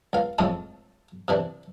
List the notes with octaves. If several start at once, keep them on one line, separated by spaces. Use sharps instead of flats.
C#2 F5
F2 A2 C#3 G#3 A5 D#6
C3 E3 D4